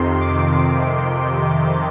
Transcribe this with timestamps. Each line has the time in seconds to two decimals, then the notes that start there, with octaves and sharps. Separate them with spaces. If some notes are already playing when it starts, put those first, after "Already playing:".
Already playing: F2 C3 D#3 C6
0.20 D6
0.97 C6